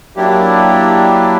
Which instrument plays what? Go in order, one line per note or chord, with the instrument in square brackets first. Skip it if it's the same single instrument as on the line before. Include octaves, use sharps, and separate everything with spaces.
[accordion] F#3 A#3 D4 E4 G4